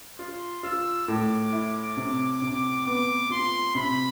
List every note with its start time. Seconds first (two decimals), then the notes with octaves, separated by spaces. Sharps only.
0.19 F4 C6
0.63 F4 E6
1.08 A2 D6
1.53 E4
1.97 C3
2.42 C3
2.86 B3 D6
3.30 F4 C6
3.75 C3 B5